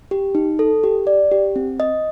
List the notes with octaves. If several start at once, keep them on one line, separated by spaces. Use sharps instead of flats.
G4
D#4
A4
G4
D5
G4
C4
D#5